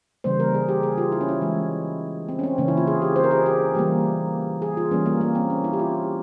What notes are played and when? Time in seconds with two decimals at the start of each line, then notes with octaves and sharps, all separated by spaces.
0.24 C#3 E3 G3 A#3 C5
0.40 A#4
0.54 G#4
0.68 G4
0.83 G#4
0.98 F4
1.12 E4
1.21 C#4
1.29 E4
1.41 E3 G#3
2.29 C4
2.39 C#4
2.43 C4
2.58 C#3 E3 A#3 C#4
2.68 E4
2.77 F4
2.87 G#4
3.02 G4
3.16 C5
3.24 A#4
3.31 G#4
3.46 G4
3.75 E3 G3 A#3
4.62 G#4
4.77 F4
4.91 E3 G3 A#3 C#4
5.06 A#3
5.21 A#3
5.35 C4
5.50 C#4
5.64 E4
5.73 G4
5.79 F4